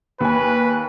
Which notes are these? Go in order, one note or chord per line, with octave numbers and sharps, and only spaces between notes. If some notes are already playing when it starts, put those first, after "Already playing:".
D#2 B4 G#5